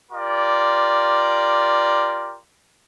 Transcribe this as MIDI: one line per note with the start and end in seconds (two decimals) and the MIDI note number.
0.12 2.36 65
0.12 2.36 67
0.12 2.36 70
0.12 2.36 74